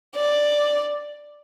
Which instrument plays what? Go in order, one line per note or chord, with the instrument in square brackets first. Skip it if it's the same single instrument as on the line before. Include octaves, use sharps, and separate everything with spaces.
[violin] D5